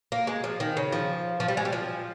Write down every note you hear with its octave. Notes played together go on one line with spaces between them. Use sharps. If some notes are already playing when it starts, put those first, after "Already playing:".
A#3
G#3
F3
D#3
C#3
F3
F3
G3
G#3
G3
F3